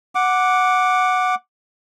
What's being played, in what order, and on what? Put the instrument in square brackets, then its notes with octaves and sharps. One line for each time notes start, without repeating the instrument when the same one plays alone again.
[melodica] F#5 D6